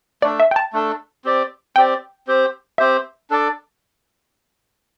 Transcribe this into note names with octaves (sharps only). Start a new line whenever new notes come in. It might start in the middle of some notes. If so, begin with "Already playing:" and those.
A3 D4 A4 D5
E5
G5
A5
A3 D4 A4
C4 G4 D5
C4 G4 D5 G5
C4 G4 C5
C4 G4 C5 E5
D4 A4 D5